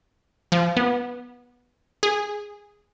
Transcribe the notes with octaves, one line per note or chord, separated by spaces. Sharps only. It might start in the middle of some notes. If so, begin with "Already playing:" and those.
F3
B3
G#4